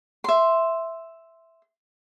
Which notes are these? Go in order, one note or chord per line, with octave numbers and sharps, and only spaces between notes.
E5 C6